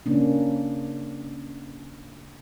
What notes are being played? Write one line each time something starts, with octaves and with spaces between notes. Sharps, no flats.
C#3 A#3 C#4 D4